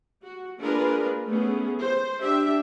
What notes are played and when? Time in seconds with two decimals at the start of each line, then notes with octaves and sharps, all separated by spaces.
0.24 F#4
0.59 A#3 D4 F4 G#4 A#4 B4
1.26 A3 B3 C#4 G#4
1.81 C5
2.21 D4 G4 E5